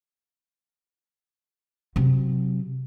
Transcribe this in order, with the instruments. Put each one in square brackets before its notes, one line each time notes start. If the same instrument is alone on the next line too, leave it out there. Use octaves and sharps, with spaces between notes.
[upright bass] C3 F#3